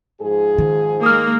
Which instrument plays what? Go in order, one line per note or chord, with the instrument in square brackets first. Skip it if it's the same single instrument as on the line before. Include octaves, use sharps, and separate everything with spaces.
[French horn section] G#2 F3 G#4
[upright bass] D#3
[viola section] G#3 A#3 [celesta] D#6 F6